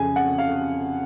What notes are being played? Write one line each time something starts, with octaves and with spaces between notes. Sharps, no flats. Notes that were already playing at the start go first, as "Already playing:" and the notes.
Already playing: F2 C#3 G#5
F#5
F5